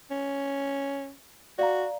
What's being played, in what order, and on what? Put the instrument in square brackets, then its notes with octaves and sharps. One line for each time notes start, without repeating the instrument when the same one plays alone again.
[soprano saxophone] C#4
[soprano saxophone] F#4 [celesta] D5 F5 A#5